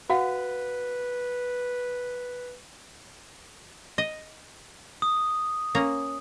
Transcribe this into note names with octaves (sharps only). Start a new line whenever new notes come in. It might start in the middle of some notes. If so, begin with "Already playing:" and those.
F#4 B4 F5 F#5
D#5
D#6
A#3 C#4 A#5